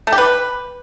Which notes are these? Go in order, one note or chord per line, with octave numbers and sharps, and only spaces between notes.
A3
G4
B4